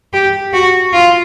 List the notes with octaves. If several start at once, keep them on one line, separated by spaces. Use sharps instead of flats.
G4
F#4
F4